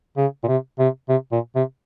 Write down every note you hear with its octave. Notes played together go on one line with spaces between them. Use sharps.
C#3
A#2
C3
C3
C3
A#2
C3